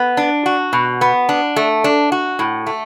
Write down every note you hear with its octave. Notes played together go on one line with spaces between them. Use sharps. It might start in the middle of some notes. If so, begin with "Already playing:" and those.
Already playing: B3
D4
F#4
B2
B3
D4
A3
D4
F#4
A2
A3